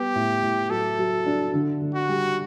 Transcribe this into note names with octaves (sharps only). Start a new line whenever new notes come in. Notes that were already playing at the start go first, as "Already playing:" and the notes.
Already playing: G3 B3 G4
A2
A2
F#3 A4
F#3
D4
D3
D3
F#4
G3